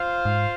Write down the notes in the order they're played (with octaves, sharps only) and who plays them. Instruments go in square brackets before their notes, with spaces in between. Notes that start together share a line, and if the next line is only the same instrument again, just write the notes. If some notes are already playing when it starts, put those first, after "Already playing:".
Already playing: [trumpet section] F4 C5 F5
[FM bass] G#2